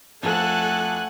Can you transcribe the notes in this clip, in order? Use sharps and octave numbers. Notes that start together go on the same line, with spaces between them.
F2 A3 A4 F#5 G#5 F#6